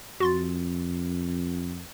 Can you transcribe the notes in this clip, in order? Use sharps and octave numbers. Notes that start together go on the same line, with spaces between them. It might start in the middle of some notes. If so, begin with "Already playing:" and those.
F2 F#4 C6 A6